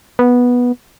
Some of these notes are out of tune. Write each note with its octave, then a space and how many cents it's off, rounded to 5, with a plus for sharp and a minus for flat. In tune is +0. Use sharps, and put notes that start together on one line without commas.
B3 -10